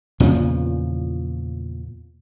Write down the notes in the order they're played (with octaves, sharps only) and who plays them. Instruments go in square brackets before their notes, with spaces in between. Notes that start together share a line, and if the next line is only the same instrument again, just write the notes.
[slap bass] E2 A#2 C#3 F3